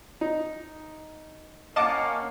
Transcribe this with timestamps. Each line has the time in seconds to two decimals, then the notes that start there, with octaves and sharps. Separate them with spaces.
0.21 D#4
1.76 A#3 C#4 D#5 F5 F#5 A5 D6 F6